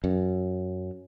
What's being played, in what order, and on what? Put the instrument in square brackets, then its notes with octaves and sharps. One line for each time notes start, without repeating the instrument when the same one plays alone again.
[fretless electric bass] F#2